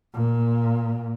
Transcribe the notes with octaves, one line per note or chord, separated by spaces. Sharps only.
A#2